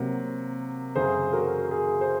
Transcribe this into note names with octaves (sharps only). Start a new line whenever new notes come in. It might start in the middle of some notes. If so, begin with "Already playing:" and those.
Already playing: C3 F#3 A#3
F#2 C#3 F#3 G#4 C5
F#4 A#4
G#4
C5